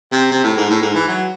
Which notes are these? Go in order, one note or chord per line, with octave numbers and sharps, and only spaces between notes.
C3
C3
A2
G#2
A2
G#2
E3
F#3